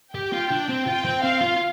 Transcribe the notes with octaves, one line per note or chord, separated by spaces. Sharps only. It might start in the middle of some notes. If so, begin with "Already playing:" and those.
G4 G5
F4
D4
C4
F4 G5
C4
C4 F5
F4